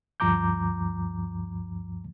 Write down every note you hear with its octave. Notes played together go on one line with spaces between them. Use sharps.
D2 G2 F3 A#5 D6 G6